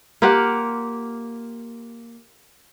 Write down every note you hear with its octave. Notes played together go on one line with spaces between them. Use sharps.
A#3 F4 G4 F#5